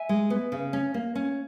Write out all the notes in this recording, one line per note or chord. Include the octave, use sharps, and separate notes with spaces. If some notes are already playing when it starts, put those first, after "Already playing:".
Already playing: E5 G#5
G#3
B3
C#3
C#4
A#3
C#4